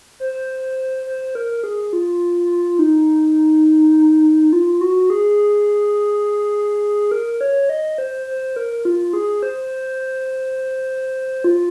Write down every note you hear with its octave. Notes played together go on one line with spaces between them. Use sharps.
C5
C5
A#4
G#4
F4
D#4
F4
F#4
G#4
A#4
C#5
D#5
C5
C5
A#4
F4
G#4
C5
F4